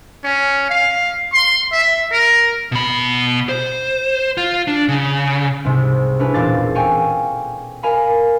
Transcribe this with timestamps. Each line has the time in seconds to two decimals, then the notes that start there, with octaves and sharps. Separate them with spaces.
0.24 C#4
0.70 F5
1.33 C6
1.72 E5
2.12 A#4
2.72 B2 B5
3.49 C5
4.37 F4
4.68 D4
4.88 C#3
5.65 C2 G#2 C3
6.19 C#4 D4 E4 B4
6.34 E1 A#2 C4 F5 D6 A6
6.75 A4 C#5 F5 G5 G#5 C#6
7.83 A#4 F5 G#5 A#5 B5